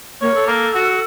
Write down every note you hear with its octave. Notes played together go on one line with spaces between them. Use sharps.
A#3 C#5
A4
A#3
F#4